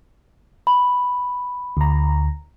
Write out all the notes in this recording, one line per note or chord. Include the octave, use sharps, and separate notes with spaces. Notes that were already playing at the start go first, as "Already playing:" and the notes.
B5
D2 A#5